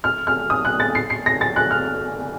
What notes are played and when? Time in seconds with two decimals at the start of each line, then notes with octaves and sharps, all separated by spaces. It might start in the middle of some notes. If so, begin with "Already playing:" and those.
0.04 F6
0.27 F6
0.50 D#6
0.65 F#6
0.80 A6
0.95 C7
1.10 C7
1.26 A#6
1.41 A6
1.56 F#6
1.71 F6